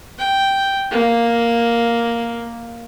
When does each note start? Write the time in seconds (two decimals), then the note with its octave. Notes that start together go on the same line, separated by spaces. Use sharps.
0.19 G5
0.91 A#3